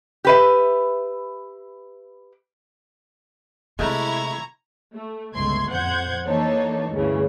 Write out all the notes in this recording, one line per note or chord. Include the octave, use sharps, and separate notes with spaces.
G4 B4 E5
C3 G#3 A3 E4 A#5 C#6 G#6
A3
G1 C#2 A3 C6 G#6
F2 C5 F#5 G6 G#6
E3 A#3 D4 D#4 A4 C#5
D2 G2 C#3 E3